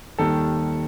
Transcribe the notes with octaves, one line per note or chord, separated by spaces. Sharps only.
D#2 D#3 G3 A4